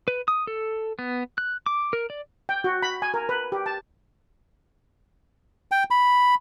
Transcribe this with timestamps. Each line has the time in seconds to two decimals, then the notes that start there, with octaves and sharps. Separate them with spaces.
0.08 B4
0.28 D#6
0.47 A4
0.99 B3
1.38 F#6
1.66 D6
1.93 A#4
2.10 D5
2.49 G5
2.64 F#4
2.83 B5
3.02 G#5
3.14 A#4
3.29 B4
3.52 G4
3.66 A5
5.72 G5
5.91 B5